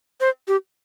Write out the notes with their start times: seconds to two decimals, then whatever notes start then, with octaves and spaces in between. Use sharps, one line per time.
0.21 C5
0.48 G4